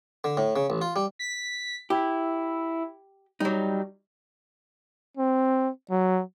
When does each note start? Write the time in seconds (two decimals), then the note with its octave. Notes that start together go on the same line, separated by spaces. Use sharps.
0.24 D3
0.37 A2
0.56 C#3
0.70 A1
0.81 F4
0.96 G3
1.19 B6
1.90 E4 G4
3.40 F#3 G3 D#4
5.17 C4
5.90 F#3